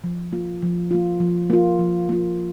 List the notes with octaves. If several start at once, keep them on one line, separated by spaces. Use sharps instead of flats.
F3
A#3 F4
F3
A#3 F4
F3
A#3 F4
F3
A#3 F4